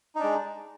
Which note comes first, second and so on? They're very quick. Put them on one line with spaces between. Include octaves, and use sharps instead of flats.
D#4 D4 G#3